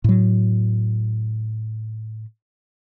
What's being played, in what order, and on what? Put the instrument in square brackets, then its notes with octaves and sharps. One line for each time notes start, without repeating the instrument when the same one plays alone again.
[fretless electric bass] A2 F#3